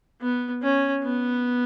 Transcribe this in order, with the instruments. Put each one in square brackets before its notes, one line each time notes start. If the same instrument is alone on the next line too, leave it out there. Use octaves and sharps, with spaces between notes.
[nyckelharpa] B3
C#4
B3